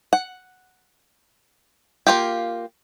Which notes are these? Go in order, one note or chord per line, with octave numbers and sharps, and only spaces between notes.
F#5
A#3 F4 G4